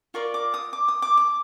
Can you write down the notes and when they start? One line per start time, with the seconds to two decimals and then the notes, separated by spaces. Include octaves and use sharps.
0.14 F4 A#4 D5 C#6
0.34 D6
0.54 D#6
0.73 D6
0.88 D#6
1.02 D6
1.17 D6